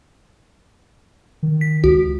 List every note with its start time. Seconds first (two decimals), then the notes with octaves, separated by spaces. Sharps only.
1.43 D#3
1.61 B6
1.84 C#2 F#4